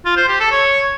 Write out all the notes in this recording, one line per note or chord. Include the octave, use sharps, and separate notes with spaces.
F4
C5
G4
A4
C#5